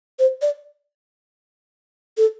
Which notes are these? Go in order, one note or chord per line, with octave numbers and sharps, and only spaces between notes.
C5
D5
A4